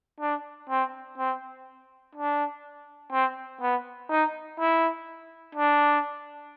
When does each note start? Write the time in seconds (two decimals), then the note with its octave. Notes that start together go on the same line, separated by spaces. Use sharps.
0.21 D4
0.70 C4
1.18 C4
2.15 D4
3.12 C4
3.61 B3
4.10 D#4
4.59 E4
5.55 D4